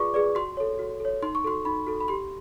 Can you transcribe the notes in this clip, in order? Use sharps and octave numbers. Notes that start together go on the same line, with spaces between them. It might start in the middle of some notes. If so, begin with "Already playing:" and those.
Already playing: F4 G#4 B4 D5 C#6 D6
G#4 B4 D5
F#4 C6
A4 C#5
F#4
A4 C#5
D#4 C6
C#6
F#4 A4 C6
D#4 B5
F#4 A4
B5
G4 C6